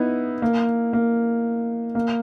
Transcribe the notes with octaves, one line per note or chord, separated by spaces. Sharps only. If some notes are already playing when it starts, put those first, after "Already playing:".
Already playing: B3 D#4 E4
A#3
A#3
A#3